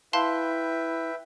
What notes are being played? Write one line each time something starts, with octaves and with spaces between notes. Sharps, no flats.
E4 B4 E5 F5 G5 A5 C6